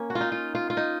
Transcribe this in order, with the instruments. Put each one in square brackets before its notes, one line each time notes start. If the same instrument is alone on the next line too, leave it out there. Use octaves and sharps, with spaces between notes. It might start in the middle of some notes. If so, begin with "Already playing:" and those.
Already playing: [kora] A#3 C#4
F#4
F4
D#4
F4
F4
F4
D#4